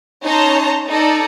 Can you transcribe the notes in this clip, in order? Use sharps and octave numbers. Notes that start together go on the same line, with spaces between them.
C#4 D#4 C#5 A5 A#5 C6
D#4 A4 D5 A#5